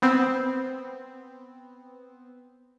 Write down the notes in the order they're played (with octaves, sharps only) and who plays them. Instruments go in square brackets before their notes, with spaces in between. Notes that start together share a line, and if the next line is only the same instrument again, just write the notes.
[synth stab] B3 C4